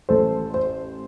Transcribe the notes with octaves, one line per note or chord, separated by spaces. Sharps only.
A1 A4 C5
C5